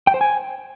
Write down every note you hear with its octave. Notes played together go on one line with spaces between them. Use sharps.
G5
C5
G#5